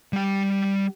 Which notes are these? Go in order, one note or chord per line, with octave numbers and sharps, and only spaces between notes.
G3 G5